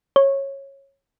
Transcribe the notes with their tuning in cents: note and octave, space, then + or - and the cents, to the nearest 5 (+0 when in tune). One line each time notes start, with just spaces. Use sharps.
C#5 -15